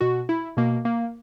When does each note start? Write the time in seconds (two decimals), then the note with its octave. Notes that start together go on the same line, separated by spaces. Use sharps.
0.01 B2 F#4
0.29 E4
0.57 B2 A#3
0.85 A#3